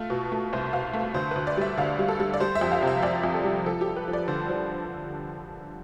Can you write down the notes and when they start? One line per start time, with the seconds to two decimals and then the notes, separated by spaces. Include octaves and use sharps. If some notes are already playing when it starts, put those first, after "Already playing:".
Already playing: A3 F4
0.10 B2
0.32 A3
0.53 C2 C5
0.73 B2 F5
0.93 A3
1.14 D2 C5
1.31 D2 B4
1.47 D5
1.57 G3 E5
1.78 D2 F5
1.99 G3
2.08 A4
2.20 G3
2.34 D5
2.40 G3 C5
2.55 E5
2.61 F2
2.72 F5
2.83 C3 E5
3.03 F2 D5
3.24 F2
3.34 A4
3.44 G3
3.66 F3 A4
3.81 G4
3.87 F3
3.96 B4
4.08 F3
4.13 D5
4.28 D3 C5
4.49 F3